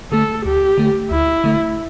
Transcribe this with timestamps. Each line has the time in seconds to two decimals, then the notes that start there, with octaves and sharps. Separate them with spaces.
0.12 D3 A3 A4
0.45 D2 G4
0.78 D3 A3
1.11 D2 E4
1.44 D3 A3